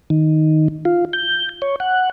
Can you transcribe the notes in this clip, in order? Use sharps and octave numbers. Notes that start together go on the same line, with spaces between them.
D#3
F4
G6
C#5
F#5